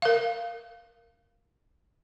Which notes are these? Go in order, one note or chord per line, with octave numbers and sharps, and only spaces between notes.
A#4 F5